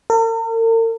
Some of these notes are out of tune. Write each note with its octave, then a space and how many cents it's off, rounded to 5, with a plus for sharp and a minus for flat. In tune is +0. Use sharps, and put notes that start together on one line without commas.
A#4 -45